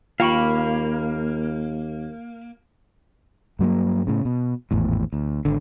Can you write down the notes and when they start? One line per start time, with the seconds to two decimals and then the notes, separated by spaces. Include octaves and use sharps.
0.20 D#2 A#3 F4 F5 G5 B5 C#6
3.59 G2 F#3 A3 A#3
4.07 A2 C#3
4.25 B2
4.71 G#1 E2 A2
5.13 D2
5.45 G#1 D3